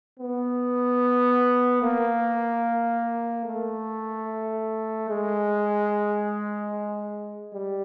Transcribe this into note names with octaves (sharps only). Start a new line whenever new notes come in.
B3
A#3
A3
G#3
G3